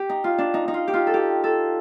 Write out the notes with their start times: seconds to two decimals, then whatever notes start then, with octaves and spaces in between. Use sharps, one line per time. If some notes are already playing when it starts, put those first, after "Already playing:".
Already playing: C4 G4
0.09 D#4
0.24 F4
0.38 D4
0.54 D#4
0.68 D#4
0.74 F4
0.88 G4
0.93 F4
1.07 A4
1.14 G4
1.44 A4